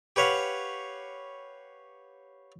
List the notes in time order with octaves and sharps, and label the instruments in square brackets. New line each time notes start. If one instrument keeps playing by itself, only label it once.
[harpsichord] G4 B4 C#5 F5 F#5